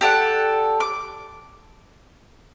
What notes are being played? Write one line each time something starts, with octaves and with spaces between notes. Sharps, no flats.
G4 A4 D5 F#5
D6